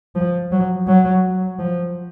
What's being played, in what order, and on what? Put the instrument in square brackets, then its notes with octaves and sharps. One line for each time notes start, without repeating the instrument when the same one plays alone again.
[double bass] F3
F#3
F#3
F3